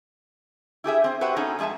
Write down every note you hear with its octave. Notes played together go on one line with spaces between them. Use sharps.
E4 G4 G#4 E5
C4 C5
F#4 G4 B4 C5 E5 F#5
B3 C#4 D#4 G#4 A4
F2 G#3 G#4 E5 A5